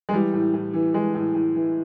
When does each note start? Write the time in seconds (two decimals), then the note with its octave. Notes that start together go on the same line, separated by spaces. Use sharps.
0.09 G#3
0.13 E3 G3
0.34 A2
0.54 A2
0.74 E3
0.94 E3 G#3
1.14 A2
1.35 A2
1.55 E3